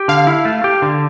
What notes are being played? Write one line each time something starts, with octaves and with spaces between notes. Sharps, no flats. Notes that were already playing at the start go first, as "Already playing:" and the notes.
Already playing: G4
D3 F5
E4
A3
G4
D3